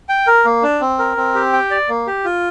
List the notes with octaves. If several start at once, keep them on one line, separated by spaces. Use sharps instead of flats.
G5
A#4
A#3
D4
C4
A#4
C4
G4
G5
D5
A#3
G4
F4